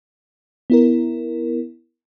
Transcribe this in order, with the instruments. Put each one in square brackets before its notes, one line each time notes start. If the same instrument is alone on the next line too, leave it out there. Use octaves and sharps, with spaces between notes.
[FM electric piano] B3 E4 A#4